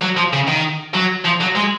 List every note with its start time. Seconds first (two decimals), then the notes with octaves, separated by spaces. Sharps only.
0.02 F#3
0.17 F3
0.33 C#3
0.47 D#3
0.94 F#3
1.25 F3
1.41 F#3
1.56 G#3